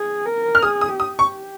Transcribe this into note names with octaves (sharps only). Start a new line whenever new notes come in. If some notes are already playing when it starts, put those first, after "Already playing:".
Already playing: G#4
A#4
F6
G#4 D#6
D#6
G4 D#6
C#6